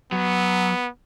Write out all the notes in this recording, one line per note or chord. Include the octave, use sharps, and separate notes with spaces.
F#3 B3